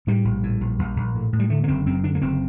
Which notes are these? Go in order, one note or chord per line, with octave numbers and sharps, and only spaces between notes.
A2 G3
A#1
A2
A#1
A#1
A#1
A2
A2
G3
D3 A3
A#3
F#1 C4
F#2 C4
D3 D4
A#3
F#1 C4